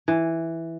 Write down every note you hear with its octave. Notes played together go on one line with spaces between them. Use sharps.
E3